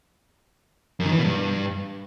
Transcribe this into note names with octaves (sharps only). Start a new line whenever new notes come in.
F#2
D#3
E3
B2
G2